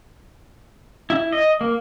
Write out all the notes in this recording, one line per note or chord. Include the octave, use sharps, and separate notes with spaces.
E4
D#5
A#3